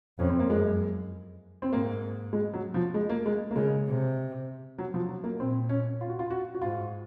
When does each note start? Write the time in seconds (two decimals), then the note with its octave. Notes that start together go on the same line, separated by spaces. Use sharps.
0.19 F2 C#4
0.30 C4
0.39 A#3
0.49 F#2 G#3
1.62 C4
1.72 G#2 A#3
2.33 G#3
2.53 F#3
2.74 F3
2.94 G#3
3.10 A#3
3.26 G#3
3.51 A#3
3.56 C#3 G#3
3.87 C3
4.78 F#3
4.94 F3
5.09 F#3
5.24 A#3
5.40 A#2 C4
5.69 C#4
6.01 F4
6.09 F#4
6.19 F4
6.30 F#4
6.55 F#4
6.62 G#2 F4